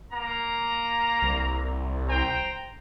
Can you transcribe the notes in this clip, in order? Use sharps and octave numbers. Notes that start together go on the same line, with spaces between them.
A#3 A#5
C2
C5 G5 A#5